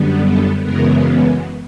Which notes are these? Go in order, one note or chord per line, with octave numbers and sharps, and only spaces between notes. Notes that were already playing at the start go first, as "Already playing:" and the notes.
Already playing: F#2 D3 G3 B3
A4
F#2 C#3 E3 G#3 B3 A#4